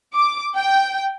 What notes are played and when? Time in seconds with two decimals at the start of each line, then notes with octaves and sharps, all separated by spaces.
0.14 D6
0.56 G5